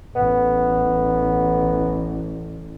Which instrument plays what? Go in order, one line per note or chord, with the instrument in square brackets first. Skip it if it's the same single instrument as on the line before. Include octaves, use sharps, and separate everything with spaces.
[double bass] A1 [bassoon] B3